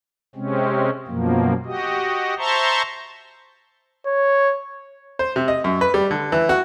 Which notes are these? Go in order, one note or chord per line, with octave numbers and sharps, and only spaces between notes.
C3 G#3 C4 C#4
F#2 B2 F3 A#3
F#4 G4 D#5
C5 E5 A5 A#5 C6 C#6
C#5
C5
C3
D#5
F#2
B4
G3
D3
E3
F#4